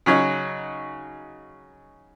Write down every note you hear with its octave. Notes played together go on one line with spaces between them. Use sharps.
C#3 F#3 C#4 D#4